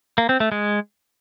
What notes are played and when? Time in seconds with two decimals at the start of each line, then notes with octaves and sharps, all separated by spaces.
0.18 A#3
0.29 C4
0.40 A3
0.52 G#3